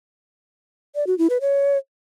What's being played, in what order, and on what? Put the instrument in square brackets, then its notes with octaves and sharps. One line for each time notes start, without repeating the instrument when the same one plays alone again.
[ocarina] D5
F#4
E4
B4
C#5